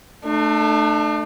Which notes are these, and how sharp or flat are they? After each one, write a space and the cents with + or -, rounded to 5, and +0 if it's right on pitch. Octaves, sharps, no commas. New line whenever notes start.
A3 +0 D4 +45